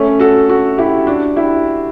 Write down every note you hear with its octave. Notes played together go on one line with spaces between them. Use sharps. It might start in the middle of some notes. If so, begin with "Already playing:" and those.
Already playing: A3 C#4
F#4 A4
F#4 A4
E4 G4
D4 F#4
E4 G4